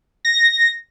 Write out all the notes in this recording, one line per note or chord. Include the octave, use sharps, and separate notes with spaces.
A#6